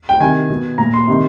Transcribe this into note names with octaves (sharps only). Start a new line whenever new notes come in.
G5
C3 D#3 G#5
B2
A#2 A#5
C6
C3 D#3